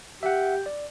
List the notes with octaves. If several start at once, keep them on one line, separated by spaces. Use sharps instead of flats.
G4 E5 F#5
D5